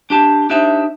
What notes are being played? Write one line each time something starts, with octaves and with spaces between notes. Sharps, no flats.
D4 G4 A5
D4 D#4 G4 C5 E5